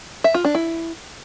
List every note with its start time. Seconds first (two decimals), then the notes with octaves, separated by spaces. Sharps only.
0.24 E5
0.34 F4
0.45 D4
0.55 E4